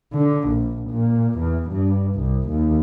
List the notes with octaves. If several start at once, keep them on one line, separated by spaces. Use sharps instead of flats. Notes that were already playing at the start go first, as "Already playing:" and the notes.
D3
A#1
A#2
E2
G2
C2
D#2